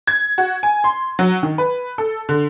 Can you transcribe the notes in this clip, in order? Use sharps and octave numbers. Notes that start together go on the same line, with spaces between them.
G#6
F#4
G#5
C6
F#3
D#3
B4
A4
D3